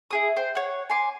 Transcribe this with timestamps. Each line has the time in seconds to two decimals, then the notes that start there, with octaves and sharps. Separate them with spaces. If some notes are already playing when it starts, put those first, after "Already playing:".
0.11 E4 G#4 D#6
0.36 C5 G5
0.55 C#5 F#5
0.90 G#5 C6 D6